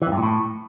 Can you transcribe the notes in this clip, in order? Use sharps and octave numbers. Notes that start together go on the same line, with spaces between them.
E3
F2
G2
A#2
A2